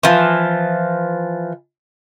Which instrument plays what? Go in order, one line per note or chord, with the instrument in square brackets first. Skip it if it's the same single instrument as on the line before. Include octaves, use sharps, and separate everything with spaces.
[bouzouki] E3 F3